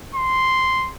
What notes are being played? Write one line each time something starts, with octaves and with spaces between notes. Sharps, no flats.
C6